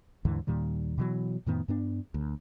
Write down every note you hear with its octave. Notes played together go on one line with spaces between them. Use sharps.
D#2 G#2 D3 E3
D#2 A#2 D#3 G3
B2 E3 F#3
F2 A2 D#3 B3
G2 B3 D4
D2